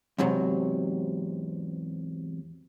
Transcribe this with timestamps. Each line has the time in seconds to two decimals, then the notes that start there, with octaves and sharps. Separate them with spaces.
0.18 E2 G#2 C3 F#3